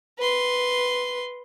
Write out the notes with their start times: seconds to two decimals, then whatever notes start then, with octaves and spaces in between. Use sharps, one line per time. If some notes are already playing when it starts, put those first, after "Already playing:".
0.19 B4 C6